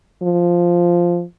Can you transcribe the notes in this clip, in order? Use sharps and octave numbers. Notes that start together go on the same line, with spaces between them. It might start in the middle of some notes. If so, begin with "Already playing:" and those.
F3